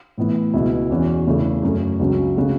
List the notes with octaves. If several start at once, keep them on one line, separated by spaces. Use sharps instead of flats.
A2 E3 B3 E4
C#2 B2 B3 E4
E2 E3 C#4 F#4
E2 C#3 A3 E4
F#2 F#3 A3
C#2 C#3 F#3 C#4
C#3 A3 F#4